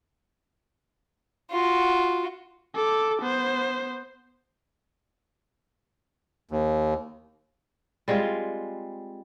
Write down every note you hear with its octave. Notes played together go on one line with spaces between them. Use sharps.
F4 F#4
A4 D6
B3 C5
D#2
G3 G#3 C4 F4